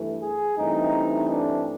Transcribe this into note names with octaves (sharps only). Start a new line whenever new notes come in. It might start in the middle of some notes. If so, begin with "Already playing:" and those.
Already playing: G2 E3 A3
G#4
G2 E3 A3 C4 D#4
D4